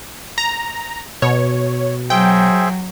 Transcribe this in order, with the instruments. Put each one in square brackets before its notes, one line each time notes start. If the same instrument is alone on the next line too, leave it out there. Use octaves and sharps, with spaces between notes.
[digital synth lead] A#5
[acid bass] B2 [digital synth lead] C#5
[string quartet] F#3 [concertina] G#4 C5 E5 [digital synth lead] G5